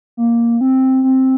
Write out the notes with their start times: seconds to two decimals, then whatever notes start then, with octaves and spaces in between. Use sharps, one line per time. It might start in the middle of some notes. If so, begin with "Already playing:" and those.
0.17 A#3
0.61 C4
1.04 C4